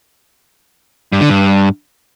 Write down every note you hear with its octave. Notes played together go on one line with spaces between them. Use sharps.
G2
D3
G2